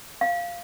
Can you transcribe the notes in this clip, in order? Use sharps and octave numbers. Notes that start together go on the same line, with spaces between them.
F5